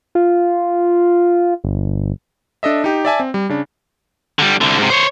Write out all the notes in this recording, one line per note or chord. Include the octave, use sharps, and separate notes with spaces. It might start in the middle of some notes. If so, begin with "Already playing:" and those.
F4
G1
D4 A4 D#5 E5
D#4 G4
D5 E5 G#5 A5
C4
G3
C#3 D4
D3 G3
C2 D3
G#2 C3
C5 C#5